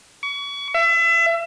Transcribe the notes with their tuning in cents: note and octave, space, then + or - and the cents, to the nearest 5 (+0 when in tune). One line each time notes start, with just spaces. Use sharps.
C#6 +35
E5 +30